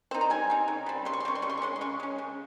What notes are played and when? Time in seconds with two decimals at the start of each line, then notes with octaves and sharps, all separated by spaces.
0.11 C4 D#4 C5
0.21 A#5
0.30 G3 G#5
0.50 C4 D#4
0.68 C#3
0.86 G3 C4
1.05 C#3 C6
1.13 C#6
1.20 C6
1.25 G3 C4 C#6
1.35 C6
1.42 C#3 C#6
1.50 C6
1.57 C#6
1.62 G#3 C#4 C6
1.76 C6
1.81 C#3 C#6
2.00 G#3 C#4
2.18 C#3